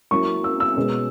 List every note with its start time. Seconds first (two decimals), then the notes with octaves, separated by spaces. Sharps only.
0.11 F#3 A#3 C#4 E4 C#6
0.44 E6
0.60 E6
0.76 B2 G#3 C#4